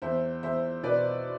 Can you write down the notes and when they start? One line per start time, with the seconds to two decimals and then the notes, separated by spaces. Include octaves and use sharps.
0.02 E2 C5 E5
0.43 E2 C5 E5
0.83 B2 B4 D5